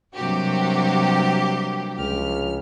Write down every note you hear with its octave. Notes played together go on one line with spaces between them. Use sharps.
G2 C3 F#3 A#3 F#4 G4
C#2 F3 F6